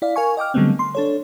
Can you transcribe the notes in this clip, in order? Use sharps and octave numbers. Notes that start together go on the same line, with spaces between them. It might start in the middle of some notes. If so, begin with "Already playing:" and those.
E4 D5 F5
A#4 F5 G#5 C#6
D#5 G5 D6 F6
D3 F#3 G3 A3 B3 C4
C6
D4 A4 C#5